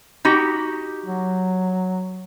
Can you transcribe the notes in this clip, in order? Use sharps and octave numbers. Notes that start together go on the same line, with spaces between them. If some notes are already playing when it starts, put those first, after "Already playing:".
D#4 F#4 G4
F#3